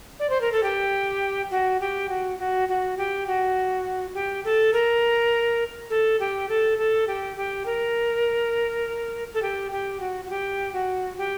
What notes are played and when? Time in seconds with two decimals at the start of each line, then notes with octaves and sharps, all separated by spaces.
0.20 D5
0.30 C5
0.41 A#4
0.52 A4
0.63 G4
1.51 F#4
1.80 G4
2.09 F#4
2.39 F#4
2.69 F#4
2.98 G4
3.27 F#4
4.14 G4
4.44 A4
4.73 A#4
5.90 A4
6.20 G4
6.49 A4
6.78 A4
7.07 G4
7.37 G4
7.66 A#4
9.34 A4
9.42 G4
9.72 G4
10.00 F#4
10.25 F#4
10.30 G4
10.73 F#4
11.18 G4